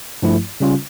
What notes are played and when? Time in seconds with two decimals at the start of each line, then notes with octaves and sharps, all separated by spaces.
0.22 G2 F3 A3 E4
0.60 C#3 G3 C#4 F4